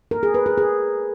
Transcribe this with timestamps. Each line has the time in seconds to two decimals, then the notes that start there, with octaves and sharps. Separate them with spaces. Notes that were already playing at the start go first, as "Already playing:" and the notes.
0.11 A#4
0.23 G#4
0.34 B4
0.46 G#4
0.58 G#4